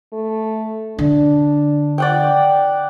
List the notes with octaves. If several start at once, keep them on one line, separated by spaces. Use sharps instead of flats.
A3
D3 D4
D5 F#5 G5